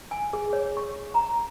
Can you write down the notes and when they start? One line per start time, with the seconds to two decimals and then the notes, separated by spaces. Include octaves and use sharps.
0.11 G#5
0.33 G#4
0.53 C#5
0.77 C#6
1.14 A#5